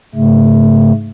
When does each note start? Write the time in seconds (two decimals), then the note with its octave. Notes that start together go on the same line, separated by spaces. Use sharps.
0.15 G#2 C#3 A3